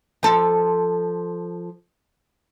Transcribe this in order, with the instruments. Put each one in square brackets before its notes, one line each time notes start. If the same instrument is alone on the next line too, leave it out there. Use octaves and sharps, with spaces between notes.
[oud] F3 A4